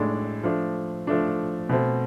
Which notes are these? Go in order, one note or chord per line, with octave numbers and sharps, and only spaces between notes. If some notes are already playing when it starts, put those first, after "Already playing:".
Already playing: A2 G#3 D4 A4 D5
F3 A3 D4
F3 A3 D4
B2 A3 C4